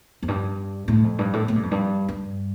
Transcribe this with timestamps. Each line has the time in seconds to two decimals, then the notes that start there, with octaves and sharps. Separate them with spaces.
0.23 F2
0.28 G2
0.88 A2
1.04 F2
1.19 G2
1.33 A2
1.48 A2
1.56 G2
1.63 F2
1.71 G2
2.08 G2